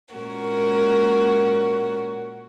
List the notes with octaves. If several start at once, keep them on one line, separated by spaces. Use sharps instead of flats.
A#2 G#3 C#4 F#4 A#4